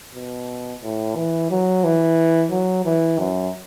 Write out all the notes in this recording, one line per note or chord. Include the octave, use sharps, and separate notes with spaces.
B2
A2
E3
F#3
E3
F#3
E3
F#2